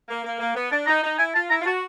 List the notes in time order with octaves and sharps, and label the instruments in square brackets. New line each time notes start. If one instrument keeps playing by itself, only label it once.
[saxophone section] A#3
A#3
A#3
B3
[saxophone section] D4 [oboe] A5
[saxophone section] D#4 [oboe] A#5
[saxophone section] D#4
[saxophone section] E4 [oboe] G#5
[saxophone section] F4 [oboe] A5
[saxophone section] E4 [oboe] A#5
[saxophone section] F4
[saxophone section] F#4 [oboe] A5